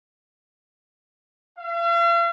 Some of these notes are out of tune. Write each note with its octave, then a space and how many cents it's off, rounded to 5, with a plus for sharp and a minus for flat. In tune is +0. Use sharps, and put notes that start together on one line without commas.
F5 -45